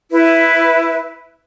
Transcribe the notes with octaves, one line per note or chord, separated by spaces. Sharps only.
E4 B4